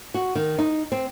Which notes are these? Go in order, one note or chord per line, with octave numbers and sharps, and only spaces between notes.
F#4
D#3
D#4
C4